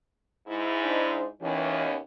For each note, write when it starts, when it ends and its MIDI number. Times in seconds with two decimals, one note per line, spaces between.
0.47 1.27 44
0.47 1.27 64
0.83 1.23 62
0.83 1.23 63
0.83 1.23 72
1.41 1.97 39
1.41 1.97 47
1.41 1.86 52
1.41 1.97 61